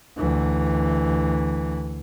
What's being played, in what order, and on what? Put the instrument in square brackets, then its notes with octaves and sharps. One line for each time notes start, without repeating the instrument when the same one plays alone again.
[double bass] D2 E3